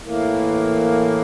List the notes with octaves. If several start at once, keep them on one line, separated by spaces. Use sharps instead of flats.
A2 E3 A#3